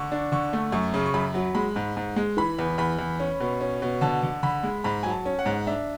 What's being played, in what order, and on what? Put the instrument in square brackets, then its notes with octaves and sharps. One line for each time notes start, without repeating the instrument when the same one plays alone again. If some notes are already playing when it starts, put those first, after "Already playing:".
Already playing: [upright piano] D3 C#6
D4
D3 C#6
A3
F#2 C#6
C#3
C#6
F#2 B5
F#3
G#3 B5
G#2
G#2
G#3
E3 B5
E2
E2 B5
E2
C#4
B2
C#4
B2
D3 A5
D3
D3 B5
G#3
G#2 B5
F#3 G#5
A5
C#4
F#5
G#2
D4 E5